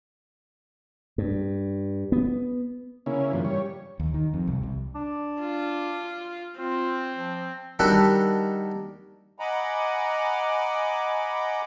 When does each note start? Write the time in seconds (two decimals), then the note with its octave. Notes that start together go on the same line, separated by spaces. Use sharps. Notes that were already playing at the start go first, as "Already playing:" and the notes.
1.18 G2
2.12 B3
3.06 C#3 A#3 C#4 E4
3.33 G2 E3 F3
3.45 G3 C#5
4.00 D#2
4.14 D#3
4.34 F2
4.47 C2
4.63 C2
4.95 D4
5.41 F4
6.58 C4 F4
7.15 F3
7.79 D#3 G3 D4 F#4 G4 A4
9.39 D#5 F#5 G#5 A#5 B5 D6